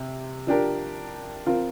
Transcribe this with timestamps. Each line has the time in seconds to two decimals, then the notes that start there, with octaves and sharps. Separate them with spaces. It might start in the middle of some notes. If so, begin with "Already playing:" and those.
Already playing: C3
0.47 F3 D4 G4 A#4
1.46 F3 C4 F4 A#4